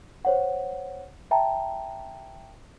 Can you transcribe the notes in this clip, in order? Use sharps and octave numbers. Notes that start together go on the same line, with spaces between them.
C5 C#5 F#5
E5 G5 A5 A#5